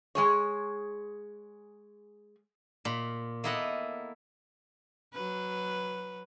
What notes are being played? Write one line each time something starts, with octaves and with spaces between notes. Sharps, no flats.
G#3 G#4 C#5
A#2 B5
A#3 B3 E4 A4 D#5 F#5
F#3 B4